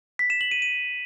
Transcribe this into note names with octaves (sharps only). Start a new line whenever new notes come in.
B6
E7
F#7
D#7
D#7